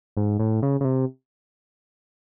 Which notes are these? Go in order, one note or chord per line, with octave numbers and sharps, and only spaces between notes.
G#2
A2
C#3
C#3
C3